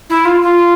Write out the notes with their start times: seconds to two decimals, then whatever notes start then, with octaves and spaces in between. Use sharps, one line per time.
0.10 E4
0.25 F4
0.42 F4